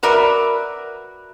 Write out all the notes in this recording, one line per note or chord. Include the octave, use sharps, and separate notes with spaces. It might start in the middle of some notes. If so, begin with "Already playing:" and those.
F#4 A#4 B4 D5 E5